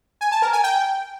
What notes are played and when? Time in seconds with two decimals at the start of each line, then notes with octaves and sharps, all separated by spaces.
0.21 G#5
0.32 A5
0.42 A#4
0.53 G#5
0.64 G5